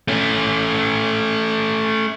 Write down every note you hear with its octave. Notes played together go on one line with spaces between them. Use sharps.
A3 C#4